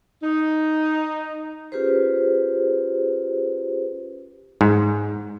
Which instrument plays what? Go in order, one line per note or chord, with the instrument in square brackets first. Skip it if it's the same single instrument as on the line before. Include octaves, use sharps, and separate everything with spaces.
[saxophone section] D#4
[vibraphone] C#4 F4 G4 G#4 B4 C5
[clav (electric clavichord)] G#2